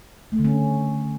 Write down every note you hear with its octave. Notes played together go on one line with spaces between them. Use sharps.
A3
D3
C#4